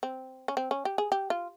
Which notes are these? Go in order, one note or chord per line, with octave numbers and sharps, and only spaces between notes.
C4
C#4
C4
C#4
G4
G#4
G4
F4